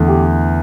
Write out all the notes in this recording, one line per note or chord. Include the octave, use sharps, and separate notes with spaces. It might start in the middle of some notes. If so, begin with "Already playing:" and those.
Already playing: E2 D3 A3
G4